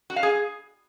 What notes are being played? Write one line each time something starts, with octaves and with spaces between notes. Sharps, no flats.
F#4
F5
G#4